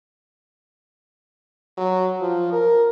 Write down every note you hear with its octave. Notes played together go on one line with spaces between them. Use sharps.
F#3
F3
A#4